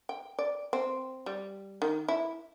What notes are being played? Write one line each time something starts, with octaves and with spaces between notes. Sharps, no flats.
G5
D5
C4
G3
D#3
E4